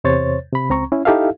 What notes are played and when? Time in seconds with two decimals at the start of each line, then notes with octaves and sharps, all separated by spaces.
0.04 E2 C3 C5 C#5 A6
0.52 C3 B5
0.70 C#2 C4 A#5 C#6
0.92 C#4 E4
1.05 D#4 E4 G4 A4 E5 F5